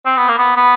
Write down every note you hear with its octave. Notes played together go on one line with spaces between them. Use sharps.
C4
B3
A#3
B3
B3